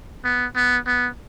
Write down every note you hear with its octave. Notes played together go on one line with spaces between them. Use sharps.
B3
B3
B3